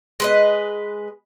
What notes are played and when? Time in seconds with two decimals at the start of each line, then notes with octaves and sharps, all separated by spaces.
0.20 G#3 B4 D#5